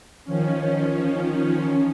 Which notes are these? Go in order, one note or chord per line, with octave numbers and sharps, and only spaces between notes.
D#3 F3 C#4